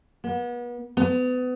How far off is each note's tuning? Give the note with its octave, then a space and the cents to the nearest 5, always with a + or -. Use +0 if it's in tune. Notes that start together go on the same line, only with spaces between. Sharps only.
B3 -35
B3 +30